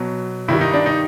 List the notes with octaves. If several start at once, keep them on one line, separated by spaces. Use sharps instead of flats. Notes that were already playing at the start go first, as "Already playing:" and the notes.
Already playing: B2 F#3
G2 D#3 G3 E4
D#4
D4
D#4